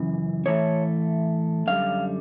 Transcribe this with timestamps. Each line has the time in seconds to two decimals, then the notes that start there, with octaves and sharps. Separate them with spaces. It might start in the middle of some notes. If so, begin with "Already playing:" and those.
Already playing: F#2 C#3 E3
0.46 A2 E3 A3 C#5
1.67 F#2 D3 G3 F5